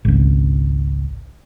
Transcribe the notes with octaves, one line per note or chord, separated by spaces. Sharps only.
G#1 C#2